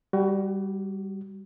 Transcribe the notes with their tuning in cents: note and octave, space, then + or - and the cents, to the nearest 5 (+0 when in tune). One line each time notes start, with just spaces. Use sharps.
G3 +0 F#4 +30